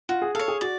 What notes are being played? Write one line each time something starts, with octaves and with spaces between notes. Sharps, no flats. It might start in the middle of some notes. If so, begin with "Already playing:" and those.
F4 F#4
G#4
A4 C#5 F5
G#4
F#4 D5